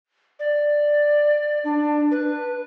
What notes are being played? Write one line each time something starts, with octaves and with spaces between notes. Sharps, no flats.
D5
D4
B4